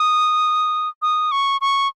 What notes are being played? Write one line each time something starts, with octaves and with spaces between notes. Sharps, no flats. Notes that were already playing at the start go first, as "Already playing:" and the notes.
Already playing: D#6
D#6
C#6
C#6